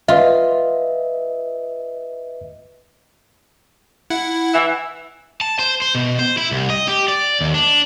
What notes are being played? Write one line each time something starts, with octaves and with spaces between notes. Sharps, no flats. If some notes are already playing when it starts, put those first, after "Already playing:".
F4 B4 D#5 E5
E4 F#5
E3 E5
A5
C5
C5
B2
C5
E4
C2
D#5
G4
D5
D#2
D4